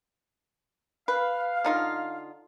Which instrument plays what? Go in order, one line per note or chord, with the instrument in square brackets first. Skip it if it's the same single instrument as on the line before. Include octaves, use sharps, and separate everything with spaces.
[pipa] B4 [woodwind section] F5
[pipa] D3 D#4 F4